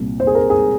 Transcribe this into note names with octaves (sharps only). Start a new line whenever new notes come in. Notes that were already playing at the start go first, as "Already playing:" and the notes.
Already playing: C2 A#2
C5
G#4
A#4
G#4